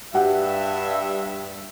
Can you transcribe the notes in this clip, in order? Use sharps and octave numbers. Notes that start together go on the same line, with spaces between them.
G2 F#4 G4 E5 F#5